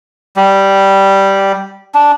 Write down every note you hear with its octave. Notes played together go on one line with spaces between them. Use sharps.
G3
D4